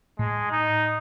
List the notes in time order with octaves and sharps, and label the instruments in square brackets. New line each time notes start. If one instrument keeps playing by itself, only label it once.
[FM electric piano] A2 [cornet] G#3
[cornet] D#4